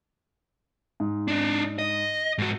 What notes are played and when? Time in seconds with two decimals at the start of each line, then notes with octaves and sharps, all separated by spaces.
1.00 G#2
1.28 D4 D#4
1.79 D#5
2.38 G#2 F#4